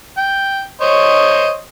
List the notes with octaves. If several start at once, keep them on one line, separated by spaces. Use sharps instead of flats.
G5
C5 C#5 D#5